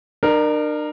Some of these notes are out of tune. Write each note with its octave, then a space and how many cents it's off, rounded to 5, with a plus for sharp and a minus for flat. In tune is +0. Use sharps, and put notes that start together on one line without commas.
D4 +40 A#4 +0